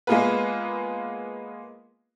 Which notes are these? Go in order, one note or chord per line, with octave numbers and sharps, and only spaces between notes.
G#3 A#3 B3 F4 G#4 B4